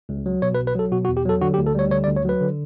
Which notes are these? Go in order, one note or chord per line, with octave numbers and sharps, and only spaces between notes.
C#2
F#3
B2 C#5
B4
B1
B4
F#3 A4
B2 F#4
F#4
E2
G4
F#3 A4
D3 F#4
G4
D2
A4
G3 C#5
D3 C#5
D5
D2
C#5
F#3 B4
D3